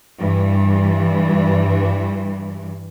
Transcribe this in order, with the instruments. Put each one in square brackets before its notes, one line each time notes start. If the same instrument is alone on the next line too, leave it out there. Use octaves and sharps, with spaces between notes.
[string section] G2 E3